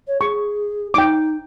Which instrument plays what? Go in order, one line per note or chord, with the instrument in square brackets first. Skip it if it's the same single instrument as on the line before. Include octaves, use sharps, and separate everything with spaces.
[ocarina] C#5
[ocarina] G#4 [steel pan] C#6
[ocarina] D#4 [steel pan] G5 D6